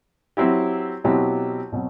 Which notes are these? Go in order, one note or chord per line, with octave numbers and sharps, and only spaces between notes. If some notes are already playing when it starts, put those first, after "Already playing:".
F#3 C4 E4 G4
B2 F#3 C4 E4 G4
B2 F#3 C4